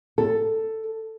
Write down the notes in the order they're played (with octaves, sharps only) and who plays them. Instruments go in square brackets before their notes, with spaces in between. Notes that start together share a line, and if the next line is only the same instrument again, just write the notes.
[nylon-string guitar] A4